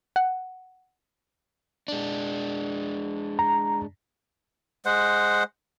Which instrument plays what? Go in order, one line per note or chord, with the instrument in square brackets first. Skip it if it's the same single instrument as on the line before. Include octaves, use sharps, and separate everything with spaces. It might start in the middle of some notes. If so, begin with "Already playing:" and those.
[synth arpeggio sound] F#5
[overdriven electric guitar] G#3 D4
[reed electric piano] A#5
[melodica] G#3 C5 F#5